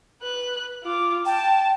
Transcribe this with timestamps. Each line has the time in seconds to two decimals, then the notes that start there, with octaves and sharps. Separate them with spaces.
0.22 B4 F#6
0.84 F4 D6
1.26 G5 A5